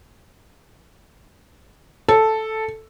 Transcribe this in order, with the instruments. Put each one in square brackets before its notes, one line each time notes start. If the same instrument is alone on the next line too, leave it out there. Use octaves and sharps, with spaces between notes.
[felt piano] A4